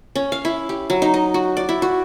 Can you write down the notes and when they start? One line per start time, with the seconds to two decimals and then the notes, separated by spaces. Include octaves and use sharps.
0.15 C#4
0.32 F5
0.45 E4
0.69 G4
0.90 F#3
1.02 D#4
1.14 D#5
1.34 F#4
1.57 D5
1.69 E4
1.82 F#4